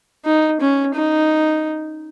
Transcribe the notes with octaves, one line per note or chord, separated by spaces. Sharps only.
D#4
C#4
D#4